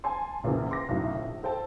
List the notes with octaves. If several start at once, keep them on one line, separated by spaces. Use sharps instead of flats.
G#5 A5 C6
A#1 E2 A#2 C#3
C6 D6 A#6
B1 F#2 A2
A#1
A4 C5 G5 A5